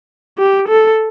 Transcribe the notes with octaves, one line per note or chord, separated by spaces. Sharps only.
G4
A4